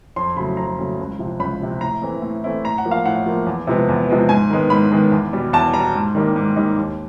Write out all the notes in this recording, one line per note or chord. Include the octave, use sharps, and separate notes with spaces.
F2 C6
C#3 F#3 A3 B5
F2 A#5
C#3 F#3 A3
C#2
C3 F3
C#2 B5
C3 F3
A2 A#5
E3 A3 C4 E4
A2
E3 A3 C4 E4
A2 A#5
F#5
F3 A#3
F5
A2 F#5
F3 A#3
E2
C3 F3 G#3 B3
E2
C3 F3 G#3 B3
G#2 G#5
D#3 G#3 B3
G#2 B5
D#3 G#3 B3
E2
B2 G3
E2 A5
B2 G3 A#5
G#2
D#3 G3 A#3 D#4
G#2
D#3 G3 A#3 D#4
D#2